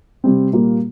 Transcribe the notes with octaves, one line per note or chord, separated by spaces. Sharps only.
C3 G3 C4
A#2 G3 A#3 F4